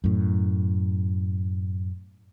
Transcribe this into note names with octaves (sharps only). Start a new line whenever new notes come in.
F#2 A2